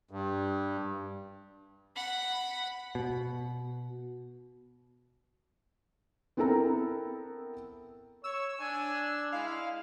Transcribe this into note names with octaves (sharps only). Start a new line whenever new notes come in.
G2
F#5 B5
B2
B3 C4 E4 A4 A#4 A#5
C#5 E6
D4 G#5
G#3 E4 F5